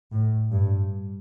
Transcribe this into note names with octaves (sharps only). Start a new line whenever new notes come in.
A2
G2